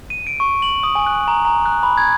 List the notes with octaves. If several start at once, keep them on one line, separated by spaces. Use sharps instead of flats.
D#7
D7
C#6
F#7
D#6
G#5
F#6
A#5
A#5
F#6
B5
G#6